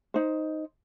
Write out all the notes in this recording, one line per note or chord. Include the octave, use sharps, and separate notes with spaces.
D#4 C5